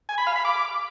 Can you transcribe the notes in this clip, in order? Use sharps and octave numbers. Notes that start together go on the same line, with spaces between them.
G#5
B5
F5
B5
D6